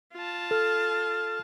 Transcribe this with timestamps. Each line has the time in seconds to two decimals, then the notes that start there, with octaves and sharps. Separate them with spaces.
0.13 F4 A5
0.51 A4 F6